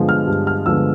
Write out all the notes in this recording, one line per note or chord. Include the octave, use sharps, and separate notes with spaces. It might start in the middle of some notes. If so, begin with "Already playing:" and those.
Already playing: G2 D3 F3 G#3 B3
F6
G2
F6
D3 F3 G#3 B3 E6